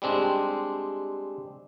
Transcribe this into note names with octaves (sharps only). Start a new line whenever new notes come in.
G3 G#3 C4 D4